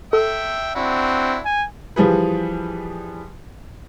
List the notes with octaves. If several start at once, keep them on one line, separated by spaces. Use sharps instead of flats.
A4 E5 G5
C4 D4 E4 F#4
G#5
E3 F3 G3 G#4 B4